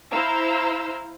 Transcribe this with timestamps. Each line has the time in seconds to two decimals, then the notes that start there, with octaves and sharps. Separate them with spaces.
0.12 E4 C5 F5 A#5 E6